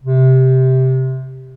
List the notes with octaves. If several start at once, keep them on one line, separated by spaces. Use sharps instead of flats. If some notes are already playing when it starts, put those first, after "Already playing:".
C3